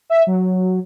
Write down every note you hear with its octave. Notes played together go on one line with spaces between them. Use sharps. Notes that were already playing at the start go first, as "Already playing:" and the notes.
E5
F#3